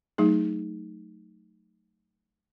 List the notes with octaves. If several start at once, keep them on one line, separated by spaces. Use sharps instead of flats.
F#3 A3 D#4 G#4